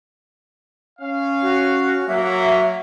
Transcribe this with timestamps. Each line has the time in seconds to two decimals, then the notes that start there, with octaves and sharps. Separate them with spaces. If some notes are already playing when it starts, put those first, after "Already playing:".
0.99 C#4 F5
1.42 F#4
2.08 F#3 A#3 E5